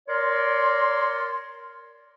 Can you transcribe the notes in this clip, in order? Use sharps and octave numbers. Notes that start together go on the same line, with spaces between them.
A#4 C#5 D5 C6